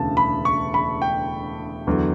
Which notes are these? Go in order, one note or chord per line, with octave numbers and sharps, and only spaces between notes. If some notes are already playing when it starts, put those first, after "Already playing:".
Already playing: E1 D2 C#3 A5
B5
C#6
B5
G5
E2 D3 F#3